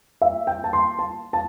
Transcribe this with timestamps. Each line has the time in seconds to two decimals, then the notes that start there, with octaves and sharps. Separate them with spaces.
0.21 E5
0.47 G5
0.64 A5
0.73 C6
0.99 A5
1.33 A5